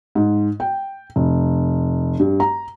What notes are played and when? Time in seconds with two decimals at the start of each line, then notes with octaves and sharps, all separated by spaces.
0.15 G#2
0.60 G5
1.16 F1
2.19 G2
2.40 A#5